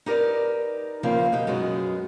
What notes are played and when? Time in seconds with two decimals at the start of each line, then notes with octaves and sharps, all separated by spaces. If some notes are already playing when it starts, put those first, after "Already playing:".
0.06 D#4 G4 A#4 B4 D5
1.03 E2 C#3 F3 A#3 C4 F5
1.32 B2 D#4 G4 G5
1.47 F#2 G#3 B3 F#4